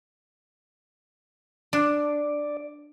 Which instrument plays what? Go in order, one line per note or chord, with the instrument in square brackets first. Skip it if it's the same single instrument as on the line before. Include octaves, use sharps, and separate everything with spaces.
[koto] D4 [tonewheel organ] D5